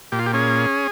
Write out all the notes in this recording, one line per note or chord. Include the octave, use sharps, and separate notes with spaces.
A#2 G4
F4
G4
C#4 G#4